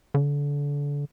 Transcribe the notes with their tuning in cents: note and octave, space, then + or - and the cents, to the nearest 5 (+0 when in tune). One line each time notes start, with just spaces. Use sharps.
D3 -30